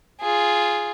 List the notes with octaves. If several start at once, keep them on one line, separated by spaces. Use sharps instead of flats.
F4 G#4